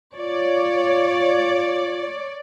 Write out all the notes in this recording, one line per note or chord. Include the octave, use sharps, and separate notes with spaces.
F4 C#5 D5